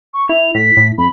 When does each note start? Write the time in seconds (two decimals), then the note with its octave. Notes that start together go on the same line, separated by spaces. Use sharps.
0.14 C#6
0.29 E4 F7
0.55 A2 B6
0.77 A2
0.98 F2 B5